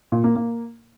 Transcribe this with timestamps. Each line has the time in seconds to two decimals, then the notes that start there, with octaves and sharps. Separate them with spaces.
0.12 A#2
0.24 A#3
0.36 A#3